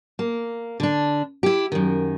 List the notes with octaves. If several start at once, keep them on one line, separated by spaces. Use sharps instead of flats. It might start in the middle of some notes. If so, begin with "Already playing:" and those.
A#3
D3 D4
E4 G4
F#2 D#3